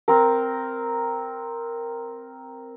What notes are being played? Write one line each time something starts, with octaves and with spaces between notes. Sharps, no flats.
C4 A#4